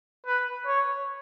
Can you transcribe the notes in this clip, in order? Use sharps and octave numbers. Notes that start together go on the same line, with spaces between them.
B4
C#5